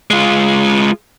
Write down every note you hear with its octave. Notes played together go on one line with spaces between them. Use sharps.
G#3 F4